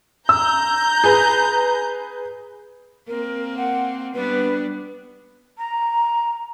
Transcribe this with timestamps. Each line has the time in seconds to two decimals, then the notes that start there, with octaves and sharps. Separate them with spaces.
0.29 A#5 E6 G6
1.04 G#4 B4
3.08 A#3 C4 A#4
3.57 F#5
4.14 G3 B3 D4 B4
5.57 A#5